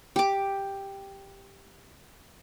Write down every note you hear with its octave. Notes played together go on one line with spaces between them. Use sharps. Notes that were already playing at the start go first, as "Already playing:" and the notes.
G4 D6